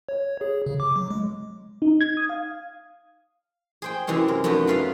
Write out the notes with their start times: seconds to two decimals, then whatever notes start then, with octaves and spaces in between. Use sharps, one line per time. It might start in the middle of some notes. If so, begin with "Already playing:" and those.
0.09 C#5
0.41 G#4
0.66 C#3
0.80 D6
0.96 F#3
1.10 G#3
1.82 D#4
2.01 G#6
2.17 D#6
2.29 F5
3.82 G#4 C5 G5
4.07 F#2 C3 E3 G#3 C4 C#4
4.28 A#4
4.44 F#2 A3 B3 D#4 F#4
4.67 F#3 F4 B4 E5 F5